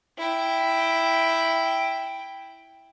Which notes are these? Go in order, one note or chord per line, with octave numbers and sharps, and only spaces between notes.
E4 G5